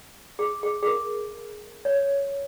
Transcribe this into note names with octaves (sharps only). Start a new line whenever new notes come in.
G#4
G#4
G#4
A#4
C#5